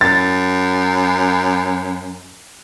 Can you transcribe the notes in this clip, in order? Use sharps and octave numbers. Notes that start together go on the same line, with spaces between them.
F#2 A6